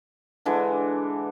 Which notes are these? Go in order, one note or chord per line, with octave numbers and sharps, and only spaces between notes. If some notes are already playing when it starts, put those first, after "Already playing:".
D3 E3 G#3 D4